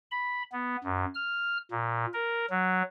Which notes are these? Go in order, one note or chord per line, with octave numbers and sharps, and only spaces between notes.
B5
B3
F#2
F6
A#2
A#4
F#3